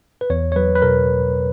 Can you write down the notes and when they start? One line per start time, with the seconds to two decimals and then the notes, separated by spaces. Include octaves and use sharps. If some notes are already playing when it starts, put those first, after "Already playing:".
0.21 B4
0.30 E2 C#5
0.52 C#5
0.56 F#3 B4
0.75 B4
0.82 B2 A#4